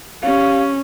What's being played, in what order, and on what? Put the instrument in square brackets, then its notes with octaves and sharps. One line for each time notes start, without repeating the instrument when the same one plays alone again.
[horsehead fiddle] C#4 [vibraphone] G4 F5